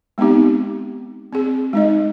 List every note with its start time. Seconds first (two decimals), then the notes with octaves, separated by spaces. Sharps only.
0.18 G#3 B3 C4 D#4 G4
1.33 C4 G#4
1.73 G#3 D#4 D#5